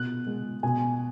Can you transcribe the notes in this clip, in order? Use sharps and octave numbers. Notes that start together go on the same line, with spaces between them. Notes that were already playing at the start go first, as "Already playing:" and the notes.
Already playing: B2 F#6
G#3
B2 G#5